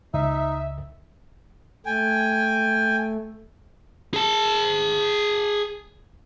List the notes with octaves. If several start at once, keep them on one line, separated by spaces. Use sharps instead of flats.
C#2 D#4 E5
A3 G5 G#5
G#4 A5